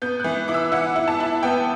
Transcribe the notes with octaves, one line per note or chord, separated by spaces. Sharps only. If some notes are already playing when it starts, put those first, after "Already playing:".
B3 G6
E3 F#6
E4 D6
E6
E4 F#5
E4
A5
E4
B3 G5